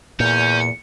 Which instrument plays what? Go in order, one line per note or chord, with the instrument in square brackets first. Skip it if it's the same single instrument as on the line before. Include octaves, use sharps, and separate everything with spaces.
[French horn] E2 [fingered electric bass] A#2 [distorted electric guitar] C#4 [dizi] G6